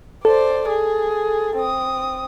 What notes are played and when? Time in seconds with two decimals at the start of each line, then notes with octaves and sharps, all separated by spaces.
0.25 A4 C5 D5
0.69 G#4
1.57 C4 D#6